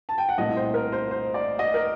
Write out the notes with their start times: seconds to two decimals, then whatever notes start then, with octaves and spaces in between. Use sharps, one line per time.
0.09 A5
0.18 G5
0.29 F#5
0.38 C2 A#2 A3 C4 D#5
0.56 C5
0.74 A#4
0.92 C5
1.11 C5
1.34 D5
1.59 D#5
1.74 A#4